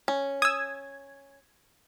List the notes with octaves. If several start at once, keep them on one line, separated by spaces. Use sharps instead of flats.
C#4
D#6 E6 G#6